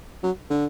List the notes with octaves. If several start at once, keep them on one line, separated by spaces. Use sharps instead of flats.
F#3
D3